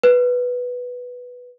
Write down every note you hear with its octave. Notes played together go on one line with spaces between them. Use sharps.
B4